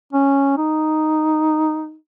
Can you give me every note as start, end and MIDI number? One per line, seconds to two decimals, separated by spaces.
0.13 0.55 61
0.57 1.96 63